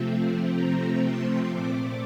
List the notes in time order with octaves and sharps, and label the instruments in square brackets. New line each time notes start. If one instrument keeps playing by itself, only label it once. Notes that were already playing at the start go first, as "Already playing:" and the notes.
Already playing: [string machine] C3 F3 A3 C4
A#5
C6
A#2 A3 C4 D6